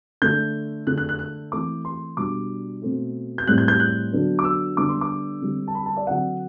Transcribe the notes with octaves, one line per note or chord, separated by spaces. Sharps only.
D3 A3 D4 G6
D3 A3 D4 F#6
F#6
F#6
F#6
E3 A3 C4 D6
C6
B2 G3 D4 D6
B2 A3 C4
G6
A2 G3 C4 F#6
G6
G6
F#6
D3 F#3 B3 D4
D6
E6
D3 G3 B3 D4 D6
C6
D6
D3 G3 C4
A5
B5
A5
D5
D3 F#3 C4 F#5